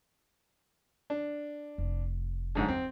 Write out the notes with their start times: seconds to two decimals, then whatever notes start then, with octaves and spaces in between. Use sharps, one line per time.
1.10 D4
1.78 F1
2.55 B1 G#2 D3
2.68 G1 E2 C4